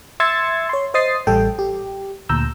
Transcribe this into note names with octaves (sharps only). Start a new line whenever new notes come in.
E5 C6 E6 G#6 A6 C#7
C#5 C6
C5 D#5 D#6 A6 C7
A1 G3 A4 G5
G4
D2 A#2 A#5 E6 G6